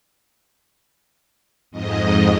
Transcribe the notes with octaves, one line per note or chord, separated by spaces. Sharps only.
F2 G#2 D#5